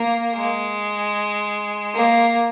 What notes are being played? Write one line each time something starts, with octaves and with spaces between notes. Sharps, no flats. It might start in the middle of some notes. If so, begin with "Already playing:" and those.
Already playing: A#3
G#3
A#3